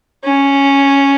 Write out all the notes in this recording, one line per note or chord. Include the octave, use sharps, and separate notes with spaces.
C#4